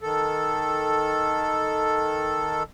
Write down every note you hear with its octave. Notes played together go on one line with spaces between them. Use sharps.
D#3 A4